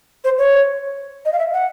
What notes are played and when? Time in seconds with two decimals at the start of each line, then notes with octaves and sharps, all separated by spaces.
0.24 C5
0.38 C#5
1.25 D#5
1.33 F5
1.39 E5
1.53 F#5